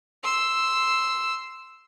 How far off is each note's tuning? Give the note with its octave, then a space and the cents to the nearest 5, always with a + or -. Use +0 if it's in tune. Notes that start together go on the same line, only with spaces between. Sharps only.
C6 +0 E6 +0